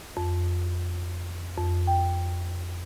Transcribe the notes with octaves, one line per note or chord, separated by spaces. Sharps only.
F2
F2
G5